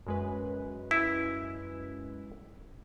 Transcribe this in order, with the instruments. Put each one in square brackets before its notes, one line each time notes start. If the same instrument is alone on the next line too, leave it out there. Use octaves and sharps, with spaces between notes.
[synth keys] F#2 G#3 B4
[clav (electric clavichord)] E4